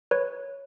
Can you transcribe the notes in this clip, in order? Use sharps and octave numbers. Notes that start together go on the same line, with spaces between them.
B4 C#5